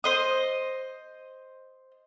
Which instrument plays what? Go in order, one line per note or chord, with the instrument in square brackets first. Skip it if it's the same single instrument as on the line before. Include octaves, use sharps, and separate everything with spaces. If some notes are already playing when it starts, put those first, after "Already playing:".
[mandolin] C5 D#5 D#6